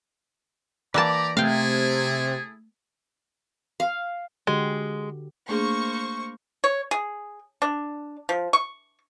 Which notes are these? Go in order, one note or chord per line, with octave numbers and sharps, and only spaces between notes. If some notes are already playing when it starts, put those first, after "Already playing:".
E3 A#3 G4 D5 A5 A#5
C3 A3 E4 G#4 A4 F5 G5
F5
D3 G#3 F#4 G4
A3 A#3 D4 G#4 C5 C#6
C#5
G#4
D4
F3
C#6